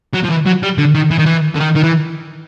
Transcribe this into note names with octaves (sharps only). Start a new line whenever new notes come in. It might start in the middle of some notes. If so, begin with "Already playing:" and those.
F#3
F3
E3
F#3
G3
D3
D#3
E3
D#3
E3
D3
D#3
D#3
E3